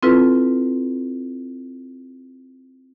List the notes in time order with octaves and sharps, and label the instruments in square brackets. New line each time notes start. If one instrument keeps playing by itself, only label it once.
[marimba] C4 E4 F4 A4 B4